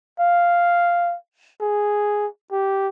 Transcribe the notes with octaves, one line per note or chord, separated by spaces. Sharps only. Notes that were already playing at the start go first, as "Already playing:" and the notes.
F5
G#4
G4